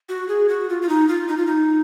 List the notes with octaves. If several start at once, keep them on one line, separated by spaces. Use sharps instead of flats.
F#4
G#4
F#4
F4
F4
D#4
F4
D#4
F4
D#4